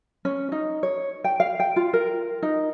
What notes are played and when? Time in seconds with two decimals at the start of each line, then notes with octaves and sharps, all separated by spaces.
0.25 C#4
0.52 D#4
0.83 C#5
1.24 G5
1.40 F5
1.60 G5
1.76 F4
1.93 A#4
2.43 D#4